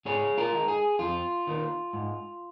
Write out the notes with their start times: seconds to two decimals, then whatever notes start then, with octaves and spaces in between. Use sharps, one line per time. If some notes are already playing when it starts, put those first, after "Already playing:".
0.05 G#2 G#4 C#5
0.38 F4 A#4
0.53 G#3 D#4
0.68 G#4
0.99 F2 F4
1.47 D#3 A#3
1.93 G#2